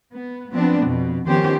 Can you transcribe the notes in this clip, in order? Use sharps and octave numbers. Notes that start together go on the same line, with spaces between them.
B3
F3 B3 C4 D4
F2 B2
D#3 F3 B3 C#4 G4 C5